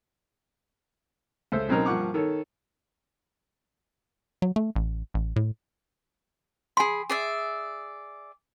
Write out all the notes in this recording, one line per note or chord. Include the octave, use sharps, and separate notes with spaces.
C#2 A4 C5 E5
B2 F#3 C4 C#4 D#4 A#4
G2 F3 A#3 F#5 C#6 D6
D#3 A4 C#5
F#3
A3
A1
A1
A2
G#4 G#5 B5 C6
G#4 D5 E5